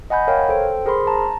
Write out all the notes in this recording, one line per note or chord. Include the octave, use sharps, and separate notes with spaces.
D#5 F#5 G#5 B5 G6
A#4 C#5 F5 G5
A4 C5 G5
G#4 A#4 C5 B5 C6
A5 A#5